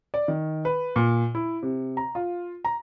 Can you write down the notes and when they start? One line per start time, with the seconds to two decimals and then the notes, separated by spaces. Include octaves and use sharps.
0.14 D5
0.28 D#3
0.65 B4
0.96 A#2
1.35 E4
1.63 C3
1.97 A#5
2.15 F4
2.65 A#5